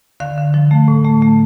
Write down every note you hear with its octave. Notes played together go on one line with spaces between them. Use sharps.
D3 F5
D3
F3
A3
A2
A3
A3